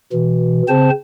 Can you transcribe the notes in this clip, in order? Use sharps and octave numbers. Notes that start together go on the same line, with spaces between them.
B2 E3
C#3 C4 C5 A5